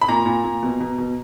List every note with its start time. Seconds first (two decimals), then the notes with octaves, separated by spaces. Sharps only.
0.01 B5
0.08 A#2 A#5
0.26 A#2
0.44 A#2
0.63 B2
0.80 B2
0.98 B2